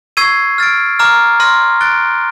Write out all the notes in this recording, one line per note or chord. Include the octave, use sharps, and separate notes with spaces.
C#6 E6 G#6 C7 D#7
F6 A6 D7
A#5 D6 F6
C6 F6 A#6 D#7
F#6 A6 D7 G7